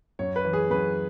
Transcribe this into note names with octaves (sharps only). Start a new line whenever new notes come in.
F#2 C#5
B4
E3
G#4
F#2 B4